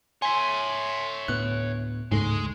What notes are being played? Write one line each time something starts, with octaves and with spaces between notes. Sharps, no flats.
C#5 E5 G#5 C6
D2 A2 B3 F#6
D1 G#2 C#3 G#3 A3